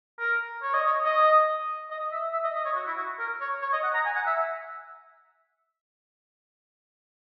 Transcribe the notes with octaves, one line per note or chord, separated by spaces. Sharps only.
A#4
C#5
D#5
C#5
D#5
D#5
E5
E5
D#5
D#5
C#5
F#4
E4
F#4
A#4
C#5
C#5
D#5
F#5
A#5
G#5
F#5
E5